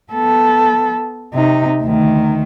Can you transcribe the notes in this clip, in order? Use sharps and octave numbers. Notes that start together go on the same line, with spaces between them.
B3 A4
C3 D#4
D2 D#3